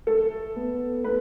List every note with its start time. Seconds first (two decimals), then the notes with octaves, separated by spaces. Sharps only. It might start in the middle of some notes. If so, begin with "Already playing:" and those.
0.07 A3 A4
0.56 B3
1.04 A3 B4